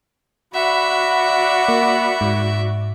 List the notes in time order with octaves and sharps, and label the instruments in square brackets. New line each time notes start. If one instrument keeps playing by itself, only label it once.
[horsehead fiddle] F#4 D5 [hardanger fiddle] E5 [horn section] F#5 B5
[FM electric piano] A#3
G#2